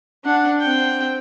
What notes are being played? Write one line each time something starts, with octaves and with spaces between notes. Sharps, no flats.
D4 F#5
C4 G5